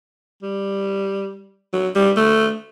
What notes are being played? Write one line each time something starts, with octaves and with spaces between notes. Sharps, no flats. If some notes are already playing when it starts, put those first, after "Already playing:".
G3
F#3
G3
A3